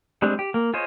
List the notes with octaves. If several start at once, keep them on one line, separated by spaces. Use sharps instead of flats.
G3 G#3 C4 D4
G4
A#3
F4 G#4 C5 C#5 D#5